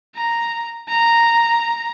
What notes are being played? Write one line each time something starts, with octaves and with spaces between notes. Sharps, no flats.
A#5
A#5